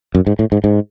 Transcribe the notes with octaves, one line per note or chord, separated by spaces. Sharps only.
F#2
G#2
A2
G#2
G#2